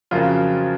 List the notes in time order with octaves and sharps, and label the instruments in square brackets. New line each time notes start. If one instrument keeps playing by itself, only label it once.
[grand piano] F2 C#3 F#3 A#3 F4